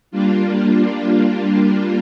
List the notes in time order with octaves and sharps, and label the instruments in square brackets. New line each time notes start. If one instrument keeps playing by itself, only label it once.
[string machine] G3 A#3 D4 F4